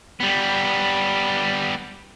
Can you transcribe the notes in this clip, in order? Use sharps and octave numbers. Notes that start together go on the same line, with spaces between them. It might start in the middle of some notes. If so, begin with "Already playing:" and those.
G3 B3